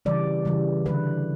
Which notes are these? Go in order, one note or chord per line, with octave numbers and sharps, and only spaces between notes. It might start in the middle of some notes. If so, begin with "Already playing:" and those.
C#3 E3 G3 D5
C#3 E3 G3
D3 G3 B4